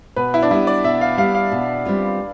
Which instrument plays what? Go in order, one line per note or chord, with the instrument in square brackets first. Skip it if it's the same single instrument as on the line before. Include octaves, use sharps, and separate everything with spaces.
[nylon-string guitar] B2 [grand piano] B4
[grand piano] E4
D4
[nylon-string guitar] G3 B3 [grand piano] E4
[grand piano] D5
[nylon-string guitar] B2 [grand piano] E5
[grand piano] F5
[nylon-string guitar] G3 B3 [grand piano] F5
[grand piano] F5
[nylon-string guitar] B2
G3 C4 F4 B4